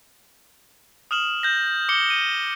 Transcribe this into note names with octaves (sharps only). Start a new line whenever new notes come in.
D#6 F6 E7 F#7
G6 A#6
D6 C#7 G7
D#7